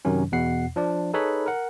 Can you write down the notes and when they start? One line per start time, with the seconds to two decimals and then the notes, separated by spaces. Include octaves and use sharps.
0.05 F#2 C3 D#3 F#3 C#4
0.32 E2 B2 F#5 C7
0.76 F3 D4 D5
1.14 D#4 G#4 A4 B4 C#5 B5
1.46 A#4 F#5